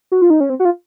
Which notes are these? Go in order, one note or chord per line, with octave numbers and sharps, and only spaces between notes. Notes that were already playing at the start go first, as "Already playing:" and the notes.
F#4
F4
D#4
C#4
C4
F#4
F4